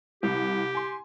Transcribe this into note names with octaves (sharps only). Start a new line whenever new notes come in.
C2 G4
G#5 C6